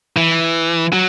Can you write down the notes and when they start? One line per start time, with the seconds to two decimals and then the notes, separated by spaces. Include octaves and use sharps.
0.17 E3
0.93 F#3